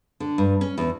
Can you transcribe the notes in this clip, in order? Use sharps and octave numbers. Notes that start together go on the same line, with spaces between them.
D3
G2
C#4
E2